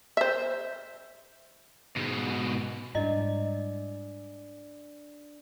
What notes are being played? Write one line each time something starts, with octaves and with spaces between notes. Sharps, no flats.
C5 E5
G#2 B2
G#2 G3 D4 E4 D5 D#5